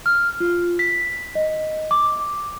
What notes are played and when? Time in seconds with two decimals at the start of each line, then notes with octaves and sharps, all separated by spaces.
0.06 F6
0.40 F4
0.79 B6
1.35 D#5
1.91 D6